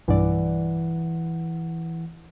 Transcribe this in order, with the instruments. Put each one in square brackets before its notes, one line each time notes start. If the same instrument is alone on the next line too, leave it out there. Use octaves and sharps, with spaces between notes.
[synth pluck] B1 G2 D5 [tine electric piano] E3 F#5